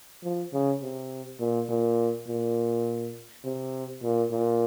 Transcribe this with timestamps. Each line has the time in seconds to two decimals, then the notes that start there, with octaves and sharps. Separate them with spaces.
0.24 F3
0.53 C#3
0.82 C3
1.40 A#2
1.69 A#2
2.28 A#2
3.44 C3
4.03 A#2
4.31 A#2